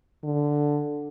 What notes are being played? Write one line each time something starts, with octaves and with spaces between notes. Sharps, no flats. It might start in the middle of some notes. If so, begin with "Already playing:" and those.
D3